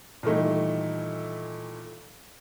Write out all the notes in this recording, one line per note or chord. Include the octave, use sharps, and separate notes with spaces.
A#2 D#3 E3 G3 A3 D#4